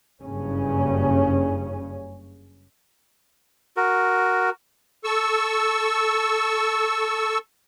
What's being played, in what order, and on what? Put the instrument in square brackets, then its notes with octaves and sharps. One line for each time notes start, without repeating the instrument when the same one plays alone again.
[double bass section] F#1 G2 C#3 C#4
[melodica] F#4 A#4
[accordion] A4 C#6 E6